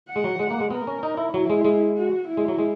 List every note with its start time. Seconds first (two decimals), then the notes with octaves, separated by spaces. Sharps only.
0.09 F#5
0.16 G#3
0.24 F#3
0.39 G#3
0.51 A#3
0.60 G#3
0.70 B3 A#4
0.87 C#4
1.03 D#4
1.17 E4
1.34 F#3 E4
1.50 G#3
1.64 G#3
1.97 F#4
2.27 E4
2.37 G#3
2.48 F#3
2.59 G#3